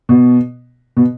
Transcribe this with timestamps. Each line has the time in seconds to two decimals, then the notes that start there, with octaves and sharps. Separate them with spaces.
0.09 B2
0.97 B2